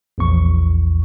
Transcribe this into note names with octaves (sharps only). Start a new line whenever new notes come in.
A#1 E2 C#6